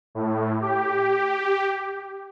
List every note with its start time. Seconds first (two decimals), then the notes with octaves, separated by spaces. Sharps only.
0.15 A2
0.61 G4